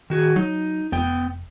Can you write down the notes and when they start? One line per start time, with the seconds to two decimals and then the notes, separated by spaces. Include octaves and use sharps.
0.10 D#3 F#4 G#4
0.36 F#3 D#4
0.92 F1 B3 G5